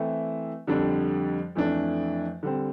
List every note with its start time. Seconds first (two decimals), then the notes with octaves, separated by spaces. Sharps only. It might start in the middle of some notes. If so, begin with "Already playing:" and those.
Already playing: E3 A3 C4 E4
0.67 F2 D3 G3 D4
1.55 F2 E3 A3 D4
2.43 D3 G3 C4